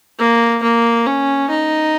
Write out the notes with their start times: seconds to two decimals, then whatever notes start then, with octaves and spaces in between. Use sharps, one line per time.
0.19 A#3
0.63 A#3
1.06 C#4
1.50 D#4